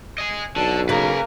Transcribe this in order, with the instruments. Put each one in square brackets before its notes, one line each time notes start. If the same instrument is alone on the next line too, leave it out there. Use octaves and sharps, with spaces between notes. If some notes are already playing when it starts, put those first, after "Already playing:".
[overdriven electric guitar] D#5 G#5
[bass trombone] B1 [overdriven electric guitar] D3 [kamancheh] A5
[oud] C#3 [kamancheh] A#3 [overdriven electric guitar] B4 A#5